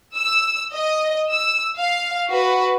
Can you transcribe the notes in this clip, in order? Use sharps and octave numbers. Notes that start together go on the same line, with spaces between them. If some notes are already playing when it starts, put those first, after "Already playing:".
E6
D#5
E6
F5
F#4 B4